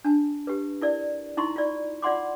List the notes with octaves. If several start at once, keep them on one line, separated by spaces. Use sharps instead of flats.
D4 A5
G4 B4
E4 A#4 D5
D#4 E4 A#5 C6 C#6
F4 D5
F4 D5 F#5 C6 D6